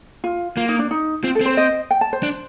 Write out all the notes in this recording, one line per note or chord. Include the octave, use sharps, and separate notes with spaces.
F4
A#3 F4
D#4
D4
D#4
C4 F4
A4
C4 C5
D#5
G5
A5
C5
D4